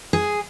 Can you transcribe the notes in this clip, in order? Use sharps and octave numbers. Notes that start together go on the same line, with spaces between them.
G#4